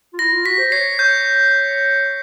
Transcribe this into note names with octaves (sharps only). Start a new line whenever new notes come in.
F4
E4 A#6
F4
F#4 B6
C5
C#5 C7
C#5 G6